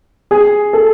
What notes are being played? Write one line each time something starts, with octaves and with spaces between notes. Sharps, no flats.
G#4
A4